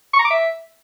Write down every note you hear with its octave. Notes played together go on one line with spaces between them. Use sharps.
C#6
A#5
D6
E5